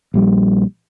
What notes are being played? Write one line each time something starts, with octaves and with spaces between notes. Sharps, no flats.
A#1 G3